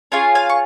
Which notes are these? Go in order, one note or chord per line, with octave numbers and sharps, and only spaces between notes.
C#4 F4 G#4 C#5 F5
F5 G#5
C#6